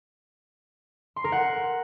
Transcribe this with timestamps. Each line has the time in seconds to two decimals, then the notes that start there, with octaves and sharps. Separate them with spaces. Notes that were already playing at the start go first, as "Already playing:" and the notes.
1.16 C6
1.24 A#4
1.32 F#5